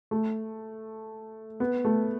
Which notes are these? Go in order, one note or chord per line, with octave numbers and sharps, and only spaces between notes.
A3
B3
A3